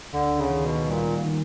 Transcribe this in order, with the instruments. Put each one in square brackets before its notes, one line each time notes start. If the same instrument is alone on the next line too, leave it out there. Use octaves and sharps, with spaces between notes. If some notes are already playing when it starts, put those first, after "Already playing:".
[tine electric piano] D2 [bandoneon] D3
[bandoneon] C#3
[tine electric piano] D#3
[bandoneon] B2
[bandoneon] A#2 [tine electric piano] G3
[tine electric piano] D#3